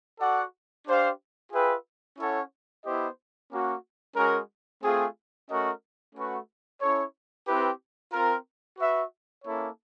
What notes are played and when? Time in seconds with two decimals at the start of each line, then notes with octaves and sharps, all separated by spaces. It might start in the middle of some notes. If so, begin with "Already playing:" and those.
0.20 F#4 A4 D5 F#5
0.86 D4 G4 C5 F5
1.51 F4 G#4 B4 E5 G5
2.18 C#4 E4 A4 C#5 F#5
2.84 B3 E4 G4 C5 D#5
3.51 A#3 C#4 F#4
4.16 G#3 C#4 F#4 A#4
4.82 A3 C4 F4 G#4
5.48 A3 C#4 F#4 A#4 D#5
6.15 A3 C#4 F#4 B4
6.80 C#4 E4 A4 C#5
7.47 C4 E4 G4 B4
8.12 C4 F4 A#4
8.78 F#4 B4 E5
9.44 A#3 C#4 E4 A4 C#5